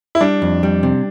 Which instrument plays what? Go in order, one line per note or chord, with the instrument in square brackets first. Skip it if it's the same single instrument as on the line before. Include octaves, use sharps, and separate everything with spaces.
[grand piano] E4
[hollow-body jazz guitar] G3 [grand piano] D4
[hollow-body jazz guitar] F2
G3
C3